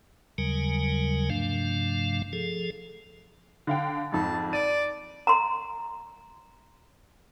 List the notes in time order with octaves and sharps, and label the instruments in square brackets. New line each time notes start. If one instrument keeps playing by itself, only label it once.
[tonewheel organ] D#2 C#3 F#3 G3 A#4 G#5
G2 C3 F3 A3 D4 F5
F3 G#4 A4
[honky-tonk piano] D3 F5 G5
[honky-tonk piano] F2 G#2 [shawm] A5
[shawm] D5 [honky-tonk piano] D#7
[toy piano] A#5 C6